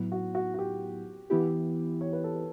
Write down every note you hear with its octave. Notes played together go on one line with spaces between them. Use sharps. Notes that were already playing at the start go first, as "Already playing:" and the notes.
Already playing: A2 F#3 B3 E4
F#4
F#4
F#4
G4
E3 B3 E4 G4
C#5
B4
A4
B4